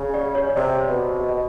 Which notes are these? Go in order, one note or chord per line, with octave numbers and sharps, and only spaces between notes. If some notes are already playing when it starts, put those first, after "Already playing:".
Already playing: C#3
D5
C#5
C3 D5
B2
D#5